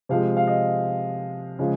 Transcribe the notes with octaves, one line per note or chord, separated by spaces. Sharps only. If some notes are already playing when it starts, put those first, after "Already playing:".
C3 F3 G#3 F5
F5
D#5
C#3 F3 G#3